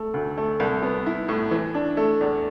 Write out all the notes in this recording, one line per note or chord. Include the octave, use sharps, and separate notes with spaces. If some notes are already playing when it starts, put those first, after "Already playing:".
Already playing: A3
D2
A3
C2
B3
E4
A2
E3
D4
A3
E2